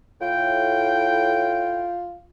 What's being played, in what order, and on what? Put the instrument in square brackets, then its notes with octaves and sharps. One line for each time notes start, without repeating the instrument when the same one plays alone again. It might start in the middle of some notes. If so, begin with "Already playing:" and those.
[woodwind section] A2 G5 [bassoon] F4